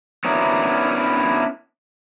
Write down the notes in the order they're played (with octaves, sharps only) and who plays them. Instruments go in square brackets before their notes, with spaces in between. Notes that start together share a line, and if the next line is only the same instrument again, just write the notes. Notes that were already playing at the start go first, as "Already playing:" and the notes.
[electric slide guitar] B3 C#4 D4 E4 A#4